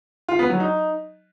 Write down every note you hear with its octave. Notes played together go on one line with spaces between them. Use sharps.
F4
B3
F#3
D#4